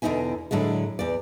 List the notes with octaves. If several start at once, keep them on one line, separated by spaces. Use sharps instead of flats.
E2 B2 D3 D#4 E4 G#5
A2 D3 F#3 G#3
E2 D5